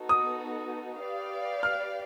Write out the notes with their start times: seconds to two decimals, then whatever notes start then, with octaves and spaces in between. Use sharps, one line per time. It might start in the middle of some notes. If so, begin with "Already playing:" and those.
Already playing: B3 D#4 F#4 A4
0.09 D#6
1.02 G4 B4 D5 F5
1.63 F6